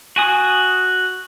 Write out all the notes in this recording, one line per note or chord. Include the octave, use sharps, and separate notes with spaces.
F#4 G#5 D#6